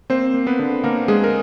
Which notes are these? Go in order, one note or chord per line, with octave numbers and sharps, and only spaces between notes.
A#3 C4 C5
A#3
B3 B4
D3
D3 A#3 A#4
D3 G#3 G#4
A#4